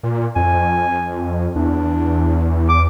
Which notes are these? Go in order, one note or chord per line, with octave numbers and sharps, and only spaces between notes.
A#2
F2 G#5
E2 D4
D6